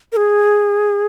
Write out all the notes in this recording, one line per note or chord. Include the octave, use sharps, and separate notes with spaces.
A#4
G#4